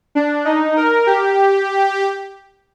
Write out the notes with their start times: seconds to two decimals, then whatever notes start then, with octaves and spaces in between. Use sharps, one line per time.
0.15 D4
0.45 D#4
0.77 A#4
1.06 G4